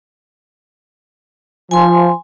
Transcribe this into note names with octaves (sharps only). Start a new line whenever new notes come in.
F3 G#5 C6